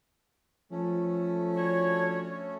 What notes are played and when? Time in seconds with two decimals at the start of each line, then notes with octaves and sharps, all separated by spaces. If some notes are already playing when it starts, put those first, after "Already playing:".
0.71 F3 A3 C#4
1.55 D4 F#4 C#5